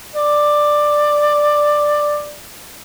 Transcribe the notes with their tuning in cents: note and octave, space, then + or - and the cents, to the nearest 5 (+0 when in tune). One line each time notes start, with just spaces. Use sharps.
D5 +10